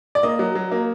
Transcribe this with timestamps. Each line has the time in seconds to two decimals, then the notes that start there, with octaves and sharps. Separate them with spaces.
0.15 D5
0.23 A#3 D#5
0.39 F#3
0.55 F#3
0.71 A#3